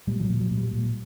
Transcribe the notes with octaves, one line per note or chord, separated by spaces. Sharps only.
A#2 G3
F3
F#3
A#2
F#3
A#2
G3
A#2